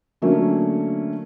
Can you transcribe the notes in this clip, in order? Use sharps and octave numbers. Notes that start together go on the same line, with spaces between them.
D3 F#3 A3 A#3 C#4